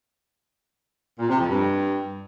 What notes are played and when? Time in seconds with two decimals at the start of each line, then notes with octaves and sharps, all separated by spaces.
1.19 A#2
1.29 C3
1.39 F2
1.50 G2